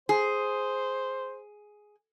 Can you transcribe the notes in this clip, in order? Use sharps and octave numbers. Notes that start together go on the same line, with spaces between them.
G#4 C5